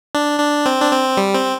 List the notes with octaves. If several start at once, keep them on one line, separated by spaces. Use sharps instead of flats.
D4
D4
C4
D4
C4
G3
C4